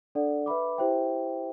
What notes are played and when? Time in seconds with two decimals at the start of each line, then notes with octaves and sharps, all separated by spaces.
0.15 D4 A4 D5 F#5
0.46 B4 E5 B5 D6
0.78 E4 G4 C5 E5 G5